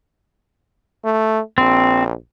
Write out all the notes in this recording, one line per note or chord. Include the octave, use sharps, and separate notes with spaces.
A3
A#1 C4